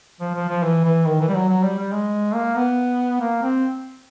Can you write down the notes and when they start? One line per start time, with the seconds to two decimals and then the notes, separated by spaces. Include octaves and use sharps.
0.21 F3
0.35 F3
0.49 F3
0.63 E3
0.85 E3
1.06 D#3
1.20 E3
1.28 G3
1.35 F#3
1.49 F#3
1.63 G3
1.78 G3
1.92 G#3
2.34 A#3
2.56 B3
3.21 A#3
3.43 C4